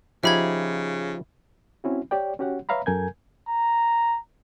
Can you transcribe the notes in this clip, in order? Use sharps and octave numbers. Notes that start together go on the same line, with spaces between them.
C#3 F3 D#4 G4 E5 B5 G#6
C4 C#4 E4 F#4
G4 C#5 D5 G5
C#4 F#4 G4 C#5 F#5
B4 C#5 E5 F5 A#5 B5
F#2 A4 A#4 G#5 G6 G#6
A#5